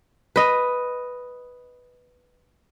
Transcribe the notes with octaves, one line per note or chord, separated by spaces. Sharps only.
B4 D#5